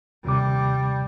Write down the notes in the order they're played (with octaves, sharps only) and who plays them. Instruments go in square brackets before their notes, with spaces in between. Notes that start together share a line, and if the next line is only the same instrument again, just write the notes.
[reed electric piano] D#2 C3 D6 [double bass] G3